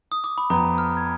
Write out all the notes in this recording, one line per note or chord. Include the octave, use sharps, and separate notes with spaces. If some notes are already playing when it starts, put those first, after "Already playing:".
D#6
D6
B5
F2 F3 B3 A#5
F6
G#6